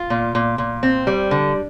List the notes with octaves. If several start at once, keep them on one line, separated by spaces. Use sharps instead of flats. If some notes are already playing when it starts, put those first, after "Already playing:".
Already playing: F4
A#2
A#2
A#2
C4
G3
D3